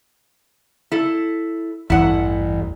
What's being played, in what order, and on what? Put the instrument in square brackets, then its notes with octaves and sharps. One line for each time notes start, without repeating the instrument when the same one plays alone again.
[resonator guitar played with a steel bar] E4 A4
[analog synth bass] A1 [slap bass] E2 G2 A3 [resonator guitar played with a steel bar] E4 F#5